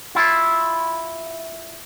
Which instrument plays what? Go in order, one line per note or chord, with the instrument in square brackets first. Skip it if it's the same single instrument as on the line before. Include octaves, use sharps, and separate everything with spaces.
[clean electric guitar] E4 F4